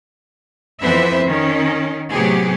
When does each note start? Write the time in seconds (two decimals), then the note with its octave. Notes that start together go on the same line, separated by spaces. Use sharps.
0.81 F2 E3 B3 B4 C5 E5
1.26 D#3 C#4
2.11 A2 C3 F#3 B3 G4 G#4